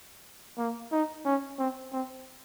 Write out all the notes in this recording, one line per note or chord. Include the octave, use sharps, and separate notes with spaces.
A#3
D#4
C#4
C4
C4